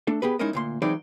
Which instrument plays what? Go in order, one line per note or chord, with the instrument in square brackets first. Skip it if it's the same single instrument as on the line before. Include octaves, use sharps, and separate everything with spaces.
[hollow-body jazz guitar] A3 D4 A4
B3 G4 G#4 B4
G#3 C#4 D#4 E4 A#4 D#5
D2 A#2 C6
E3 F#3 G#3 C4 D#4 D5